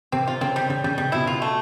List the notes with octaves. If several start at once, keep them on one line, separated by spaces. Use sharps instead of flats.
C3 C4
F4
C#3 C4
G3
C#3 G3
C#3 G3
C3 G3
B2 E4
F4
A3